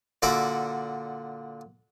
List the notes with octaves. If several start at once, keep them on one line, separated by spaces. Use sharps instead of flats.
A#2 D3 F#4 E5 F#5 D6